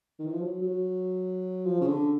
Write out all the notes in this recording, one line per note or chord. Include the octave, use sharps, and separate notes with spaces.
D#3
E3
F3
F#3
F#3
F3
C#3
D3